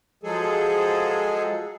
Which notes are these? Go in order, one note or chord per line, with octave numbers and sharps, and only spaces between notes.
F3 F#3 G#3 G#4 A4